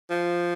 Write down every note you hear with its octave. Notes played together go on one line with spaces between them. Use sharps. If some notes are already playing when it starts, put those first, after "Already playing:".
F3